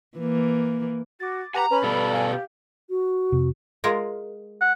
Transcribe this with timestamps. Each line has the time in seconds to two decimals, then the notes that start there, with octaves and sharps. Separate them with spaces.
0.18 E3 A#3
1.20 F#4 D6 A6
1.54 G4 B4 F#5 G#5 A#5
1.71 C#4 B4 B5
1.83 B2 G3 F4 A4
2.14 F5 G#5
2.31 G4
2.90 F#4
3.32 F2 C3 C4
3.84 G#3 F4 A#4
4.61 F#5